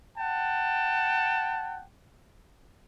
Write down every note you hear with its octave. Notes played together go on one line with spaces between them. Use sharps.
F#5 G5 A5